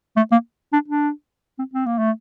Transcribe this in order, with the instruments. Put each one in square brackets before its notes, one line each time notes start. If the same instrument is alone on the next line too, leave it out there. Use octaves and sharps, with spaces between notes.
[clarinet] A3
A#3
D4
D4
C4
C4
A#3
A3